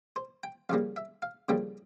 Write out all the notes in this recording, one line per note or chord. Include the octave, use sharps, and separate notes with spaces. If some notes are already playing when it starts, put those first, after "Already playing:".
C5
G5
F2 C#3 G3 A#3 F5
E5
F5
F2 C#3 G3 A#3 G5